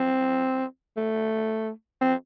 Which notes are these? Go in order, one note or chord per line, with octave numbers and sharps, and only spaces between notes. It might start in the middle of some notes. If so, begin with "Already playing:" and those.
Already playing: C4
A3
C4